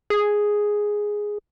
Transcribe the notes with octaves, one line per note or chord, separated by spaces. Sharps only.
G#4